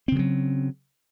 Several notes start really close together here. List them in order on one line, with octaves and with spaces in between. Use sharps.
C4 C#3 E3 F#3